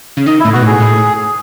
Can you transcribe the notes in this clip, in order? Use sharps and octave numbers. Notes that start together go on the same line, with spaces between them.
C#3
D#3 D#5
E4
A2
B2 F#4
A2 G#4
A2